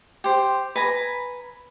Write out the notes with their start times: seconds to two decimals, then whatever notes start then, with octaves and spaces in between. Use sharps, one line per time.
0.24 G4 C5
0.76 B4 G#5 A#5